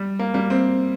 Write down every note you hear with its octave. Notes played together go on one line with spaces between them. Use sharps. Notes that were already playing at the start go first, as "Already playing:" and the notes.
Already playing: G3
A#3
G3 A#3
C4